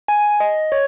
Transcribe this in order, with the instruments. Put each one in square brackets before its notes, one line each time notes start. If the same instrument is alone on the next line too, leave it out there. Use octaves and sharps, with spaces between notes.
[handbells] G#5
D#5
C#5